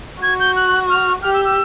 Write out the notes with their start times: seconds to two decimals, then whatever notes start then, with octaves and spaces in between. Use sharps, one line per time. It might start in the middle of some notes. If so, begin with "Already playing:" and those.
0.22 F#4 G#6
0.40 G6
0.56 F#6
0.89 F6
1.22 G4 F6
1.34 E6
1.45 E6